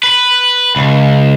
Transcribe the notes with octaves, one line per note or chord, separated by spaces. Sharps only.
B4
C#2